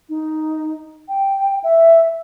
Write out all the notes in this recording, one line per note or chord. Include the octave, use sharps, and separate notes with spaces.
D#4
G5
E5